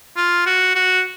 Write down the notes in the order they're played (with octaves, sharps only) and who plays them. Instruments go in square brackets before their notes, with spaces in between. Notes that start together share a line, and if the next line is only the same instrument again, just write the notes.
[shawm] F4
F#4
F#4